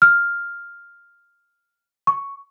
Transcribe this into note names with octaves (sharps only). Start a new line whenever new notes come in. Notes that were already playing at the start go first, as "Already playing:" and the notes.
F6
C#6